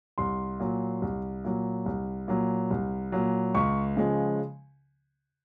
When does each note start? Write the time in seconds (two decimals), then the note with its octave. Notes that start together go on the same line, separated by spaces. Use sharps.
0.18 C2 C6
0.60 A#2 F#3
1.02 C2
1.44 A#2 F#3
1.86 C2
2.28 A#2 F#3
2.70 C2
3.12 A#2 F#3
3.54 C#2 C#6
3.96 C#3 F3 G#3